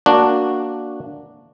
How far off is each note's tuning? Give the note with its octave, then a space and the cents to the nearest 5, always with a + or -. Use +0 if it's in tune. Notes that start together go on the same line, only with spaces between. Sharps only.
A#3 +0 D4 +0 F#4 -5